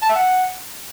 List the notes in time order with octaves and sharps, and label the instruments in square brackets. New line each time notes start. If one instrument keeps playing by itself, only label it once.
[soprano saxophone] A5
E5
F#5